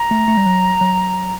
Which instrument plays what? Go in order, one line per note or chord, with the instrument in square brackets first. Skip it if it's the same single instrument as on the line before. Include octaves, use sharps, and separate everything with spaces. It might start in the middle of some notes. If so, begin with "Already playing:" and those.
Already playing: [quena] A#5
[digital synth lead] A3
A3
G3
F#3
F#3